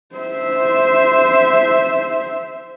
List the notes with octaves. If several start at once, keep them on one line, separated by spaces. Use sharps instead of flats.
C5 E5